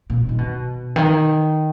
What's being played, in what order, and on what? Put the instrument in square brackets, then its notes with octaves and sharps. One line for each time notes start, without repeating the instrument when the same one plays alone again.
[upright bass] A#2
D#3
B2
D#3